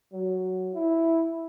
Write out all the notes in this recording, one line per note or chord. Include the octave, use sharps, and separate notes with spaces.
F#3
E4